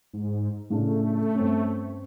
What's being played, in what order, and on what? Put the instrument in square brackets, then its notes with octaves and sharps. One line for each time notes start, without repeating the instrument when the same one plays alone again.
[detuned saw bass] G#2
[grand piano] A2 C#3 D4 [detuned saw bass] A3
[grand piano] G2 C4 C#4